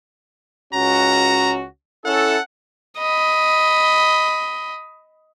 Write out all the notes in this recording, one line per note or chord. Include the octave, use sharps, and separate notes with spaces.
C#2 C#4 F#4 A#5
C#4 E4 A4 F#5
D#5 B5